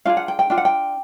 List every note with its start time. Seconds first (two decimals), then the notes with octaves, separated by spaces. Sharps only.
0.05 D4 F4 G#4 F5
0.17 F#5
0.28 G5
0.39 G5
0.50 D4 F4 G5
0.58 F#5
0.65 G5